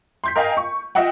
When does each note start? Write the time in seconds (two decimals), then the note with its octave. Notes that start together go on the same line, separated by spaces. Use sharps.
0.24 C6 G6 B6
0.36 A#4 D#5 F5 G5 G#5
0.57 C#6
0.95 F4 D#5 E5 F#5 G5